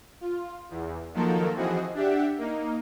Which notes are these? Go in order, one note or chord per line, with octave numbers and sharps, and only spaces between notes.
F4
E2
D#3 F3 F#3 A#3 A4 A#4
E3 F3 C4 F#4 G#4 D#5
D4 G4 E5 F#5
A#3 D#4